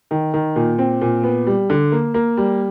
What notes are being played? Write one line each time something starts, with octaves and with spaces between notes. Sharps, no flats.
D#3
D#3
A#2
C4
A#2
B3
G3
D3
A#3
A#3
G3